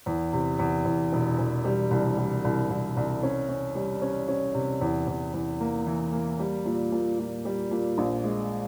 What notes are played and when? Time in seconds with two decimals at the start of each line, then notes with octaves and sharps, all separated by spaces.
0.06 E2
0.33 C3
0.59 E2
0.85 E2
1.12 E1
1.39 E1
1.65 G3
1.91 C2
2.17 G3
2.44 C2
2.70 C2
2.96 C2
3.23 C#4
3.49 C#4
3.75 G3
4.01 C#4
4.28 C#4
4.54 C3
4.81 E2
5.07 E2
5.34 E2
5.60 A#3
5.87 E3
6.12 A#3
6.39 G3
6.65 A#2
6.92 A#2
7.19 A#2
7.45 G3
7.71 A#2
7.98 A#1
8.24 G#3